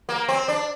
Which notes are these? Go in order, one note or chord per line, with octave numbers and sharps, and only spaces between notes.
A#3
C4
D4